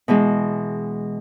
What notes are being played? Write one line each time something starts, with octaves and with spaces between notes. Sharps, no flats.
B2 E3 G#3